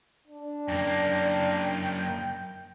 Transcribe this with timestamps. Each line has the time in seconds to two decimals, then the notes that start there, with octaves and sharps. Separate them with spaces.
0.28 D4
0.68 F#2 A#3 G5